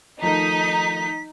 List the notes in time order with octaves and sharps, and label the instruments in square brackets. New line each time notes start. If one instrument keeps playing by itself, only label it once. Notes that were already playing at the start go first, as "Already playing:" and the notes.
[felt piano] D#3 F3 A3 [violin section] D#4 [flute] B6